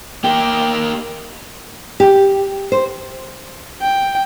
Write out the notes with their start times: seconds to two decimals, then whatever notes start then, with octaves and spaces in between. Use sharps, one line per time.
0.24 A#3 G4 G5
2.00 G4
2.72 C5
3.82 G5